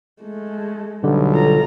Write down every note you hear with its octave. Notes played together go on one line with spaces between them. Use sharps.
G#3 A3
B1 D3 G3
F4 A4 A#5